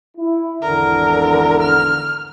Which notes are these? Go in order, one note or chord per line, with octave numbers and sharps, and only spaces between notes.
E4
G#1 E2 D3 A#4
F6